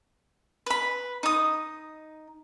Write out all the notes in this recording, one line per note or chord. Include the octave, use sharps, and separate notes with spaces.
B4 B5
D#4 D#6